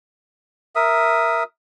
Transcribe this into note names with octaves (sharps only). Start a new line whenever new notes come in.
A#4 E5 D#6